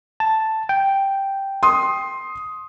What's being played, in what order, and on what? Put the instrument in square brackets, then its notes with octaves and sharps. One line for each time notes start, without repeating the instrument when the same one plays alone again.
[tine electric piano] A5
G5
[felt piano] C6 D#6